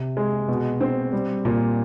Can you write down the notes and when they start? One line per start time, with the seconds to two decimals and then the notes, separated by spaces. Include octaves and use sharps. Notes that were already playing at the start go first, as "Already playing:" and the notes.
Already playing: C3
0.17 G#3
0.48 B2
0.81 C4
1.12 G3
1.45 A#2